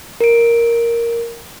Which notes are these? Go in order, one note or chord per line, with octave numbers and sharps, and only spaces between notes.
A#4 D7